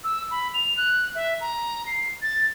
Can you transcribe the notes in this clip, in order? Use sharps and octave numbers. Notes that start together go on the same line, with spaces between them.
E6
B5
F7
F#6
E5
A#5
C7
A6